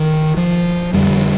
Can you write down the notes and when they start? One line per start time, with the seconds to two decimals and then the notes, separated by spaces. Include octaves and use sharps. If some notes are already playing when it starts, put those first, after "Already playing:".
Already playing: D#3
0.37 F3
0.93 F2 D3 G3